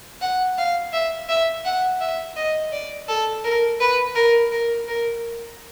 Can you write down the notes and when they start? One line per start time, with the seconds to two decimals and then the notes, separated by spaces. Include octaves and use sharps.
0.21 F#5
0.58 F5
0.93 E5
1.29 E5
1.65 F#5
2.00 E5
2.36 D#5
2.72 D5
3.08 A4
3.44 A#4
3.80 B4
4.15 A#4
4.51 A#4
4.88 A#4